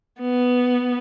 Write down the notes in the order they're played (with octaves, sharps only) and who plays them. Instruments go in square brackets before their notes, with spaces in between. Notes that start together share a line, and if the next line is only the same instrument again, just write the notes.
[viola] B3